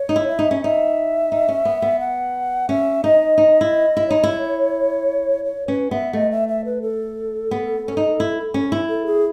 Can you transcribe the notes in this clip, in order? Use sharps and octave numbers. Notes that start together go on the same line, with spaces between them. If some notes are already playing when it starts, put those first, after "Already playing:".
Already playing: C#5
D#4
E4
E5
D#4
C#4
D#4 E5
D#4
C#4
B3
B3
F#5
C#4 E5
D#4 D#5
D#4
E4
E4
D#4 C#5
E4
C#5
C#4 B4
B3 E5
A3 D#5
E5
E5
B4
A4
B3
C#4
D#4
E4
C#4
E4
A4
G#4